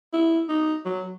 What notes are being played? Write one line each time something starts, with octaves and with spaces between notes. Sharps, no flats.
E4
D#4
F#3